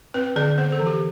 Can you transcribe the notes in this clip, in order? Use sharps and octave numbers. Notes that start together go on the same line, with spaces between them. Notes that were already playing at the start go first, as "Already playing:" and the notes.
C4 B4
D3 D5
B3 C5
A4
E3
G4